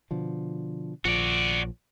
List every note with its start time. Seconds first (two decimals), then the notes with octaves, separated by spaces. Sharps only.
0.11 B2 D3 F3
1.05 A#1 F3 F#4 D5